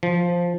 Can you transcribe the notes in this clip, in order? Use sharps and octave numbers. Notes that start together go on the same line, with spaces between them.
F3